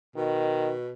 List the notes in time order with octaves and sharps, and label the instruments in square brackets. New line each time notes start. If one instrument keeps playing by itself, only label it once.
[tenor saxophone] B2 [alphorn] D#3